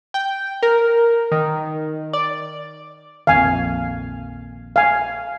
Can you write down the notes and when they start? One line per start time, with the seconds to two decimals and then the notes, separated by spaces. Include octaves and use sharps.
0.14 G5
0.63 A#4
1.32 D#3
2.13 D5
3.27 A#1 F2 D#3 F5 G#5
4.76 F5 G#5